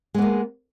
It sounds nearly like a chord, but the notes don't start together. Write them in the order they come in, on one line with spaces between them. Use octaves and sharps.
G#3 B3 A#3